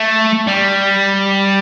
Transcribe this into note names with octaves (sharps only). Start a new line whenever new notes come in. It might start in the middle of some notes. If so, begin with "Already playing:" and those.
Already playing: A3
G3